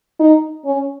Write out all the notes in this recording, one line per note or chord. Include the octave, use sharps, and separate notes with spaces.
D#4
C#4